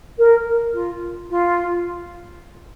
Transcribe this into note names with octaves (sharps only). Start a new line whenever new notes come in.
A#4
F4
F4